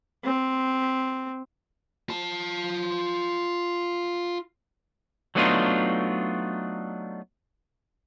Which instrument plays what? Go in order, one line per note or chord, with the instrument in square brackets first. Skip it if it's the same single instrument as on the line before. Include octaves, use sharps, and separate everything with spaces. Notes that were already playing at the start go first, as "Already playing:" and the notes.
[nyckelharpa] C4
[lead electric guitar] F4 A5
[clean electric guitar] F#3 A3 B3 D4 D#4 F4